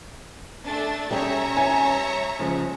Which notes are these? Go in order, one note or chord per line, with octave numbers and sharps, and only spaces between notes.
A3 D4 A6
G3 C#4 G#4 C#5 E5 A#5
G#5
C#3 F3 G#3